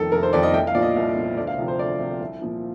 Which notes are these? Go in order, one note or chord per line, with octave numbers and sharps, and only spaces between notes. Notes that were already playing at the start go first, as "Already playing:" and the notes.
Already playing: F1 F2 D#3 A4
F1 A#4
C5
F2 D#3 D5
D#5
C2 G5
F5
A#2 F3 D5
D#5
C2
A#2 F3
D2 D5
F5
C3 F3
C5
D2 D5
C3 F3
C2
A#2 F3